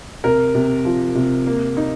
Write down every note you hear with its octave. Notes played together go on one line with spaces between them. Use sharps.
C3 A#4
C3
F3
C3
A#3
D#4